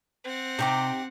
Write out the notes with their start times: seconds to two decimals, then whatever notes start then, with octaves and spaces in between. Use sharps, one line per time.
0.24 C4 F#5
0.59 C3 D#4 G4 D6